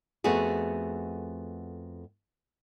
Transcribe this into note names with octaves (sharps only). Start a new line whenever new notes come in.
F2 A3 B3 F#4 G#4